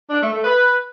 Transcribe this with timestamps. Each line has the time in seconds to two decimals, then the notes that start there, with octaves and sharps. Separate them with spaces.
0.10 D4
0.22 A3
0.33 A3
0.44 B4